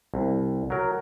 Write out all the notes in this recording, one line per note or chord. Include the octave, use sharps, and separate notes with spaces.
C2
F#3 A#4